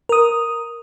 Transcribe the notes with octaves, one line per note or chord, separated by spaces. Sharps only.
A#4 D#6